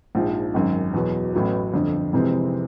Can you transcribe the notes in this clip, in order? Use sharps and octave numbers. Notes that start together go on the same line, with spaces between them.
A#1 G#2 F3
G#1 F#2 D#3
E2 B2 F#3
A1 A2 F#3 B3
G1 F2 D3
F2 C3 E3 G#3 C4